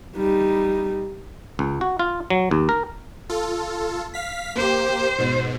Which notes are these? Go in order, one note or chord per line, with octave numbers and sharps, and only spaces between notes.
G3 D#4
C#2
F#4
F4
F#3
D#2
A#4
F4 A4
F5 B6
A#3 G4 C5
G#2 B2